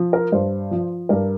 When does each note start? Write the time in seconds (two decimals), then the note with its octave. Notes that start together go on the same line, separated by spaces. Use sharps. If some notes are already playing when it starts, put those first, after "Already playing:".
Already playing: F3
0.13 A#4
0.32 G2 C5
0.71 F3
1.09 G2 A#4